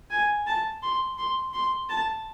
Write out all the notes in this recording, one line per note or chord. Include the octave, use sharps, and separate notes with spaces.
G#5
A5
C6
C6
C6
A5